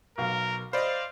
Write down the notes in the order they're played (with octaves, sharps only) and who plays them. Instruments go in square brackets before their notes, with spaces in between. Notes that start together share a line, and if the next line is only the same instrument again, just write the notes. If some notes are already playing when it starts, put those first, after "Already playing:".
[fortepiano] B1 F5 [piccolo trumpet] A#4
[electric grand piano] C5 D5 [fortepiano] D#5 B5 [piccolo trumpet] F5